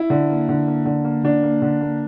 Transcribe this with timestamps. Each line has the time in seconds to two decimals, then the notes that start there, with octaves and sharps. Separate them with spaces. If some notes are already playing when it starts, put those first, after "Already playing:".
Already playing: E4
0.10 D3
0.30 A#3
0.49 D3
0.67 A#3
0.86 D3
1.05 A#3
1.24 D3 D4
1.43 A#3
1.62 D3
1.80 A#3